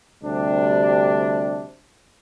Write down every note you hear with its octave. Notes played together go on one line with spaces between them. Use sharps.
D2 C3 G3 D4